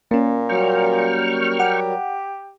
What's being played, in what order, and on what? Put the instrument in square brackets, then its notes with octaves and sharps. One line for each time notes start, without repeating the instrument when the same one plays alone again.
[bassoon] A#2 [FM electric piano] A#3 C#4
[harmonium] F#3 G3 A#4 [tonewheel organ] G5 C#6 F6
[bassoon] G4 [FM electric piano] F#5